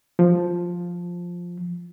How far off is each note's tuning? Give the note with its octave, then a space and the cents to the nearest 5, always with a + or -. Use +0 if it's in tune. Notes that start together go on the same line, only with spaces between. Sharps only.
F3 +5